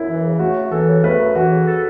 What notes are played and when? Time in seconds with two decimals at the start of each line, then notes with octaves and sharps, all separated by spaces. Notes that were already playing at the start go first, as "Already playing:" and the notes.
Already playing: F#2 E4
0.08 E3
0.24 C#3
0.39 A3 F#4
0.56 F#2
0.71 E3 A4
0.88 C#3
1.04 A3 B4
1.19 F#2
1.35 E3 F#4
1.51 C#3
1.67 A4